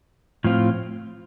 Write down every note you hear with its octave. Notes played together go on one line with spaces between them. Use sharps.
A2 F3 C4 F4